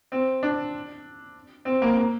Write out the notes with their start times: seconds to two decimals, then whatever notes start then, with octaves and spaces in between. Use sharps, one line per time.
0.12 C4
0.43 D4
1.65 C4
1.82 A#3
1.97 A#3